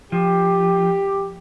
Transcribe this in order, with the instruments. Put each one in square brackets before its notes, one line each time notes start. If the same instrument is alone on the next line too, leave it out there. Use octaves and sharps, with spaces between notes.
[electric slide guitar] F3 [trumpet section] G4